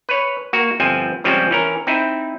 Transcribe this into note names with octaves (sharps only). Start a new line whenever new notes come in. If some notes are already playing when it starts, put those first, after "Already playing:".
B4 C#5
A#3 F#4
G1 F3 C4 G#5
C#3 F3 G3 G#3 C4 C#4
E3 C#4 A#4
C4 D#4 E4